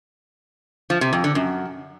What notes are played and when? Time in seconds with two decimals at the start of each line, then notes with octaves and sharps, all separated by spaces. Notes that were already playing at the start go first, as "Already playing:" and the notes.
0.90 F3
1.01 C3
1.13 F2
1.24 D3
1.35 F#2